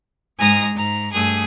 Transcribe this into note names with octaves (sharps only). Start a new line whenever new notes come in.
G#2 G#3 G#5 A#5 D#6 A#6
G#2 A#5
G2 A3 G#4 D#6